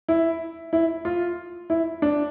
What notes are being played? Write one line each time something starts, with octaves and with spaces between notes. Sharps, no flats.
E4
E4
F4
E4
D4